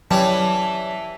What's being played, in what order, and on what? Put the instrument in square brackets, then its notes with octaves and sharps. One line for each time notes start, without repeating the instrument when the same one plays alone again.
[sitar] E3 [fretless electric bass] F#3 [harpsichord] G3 C#4 [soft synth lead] A5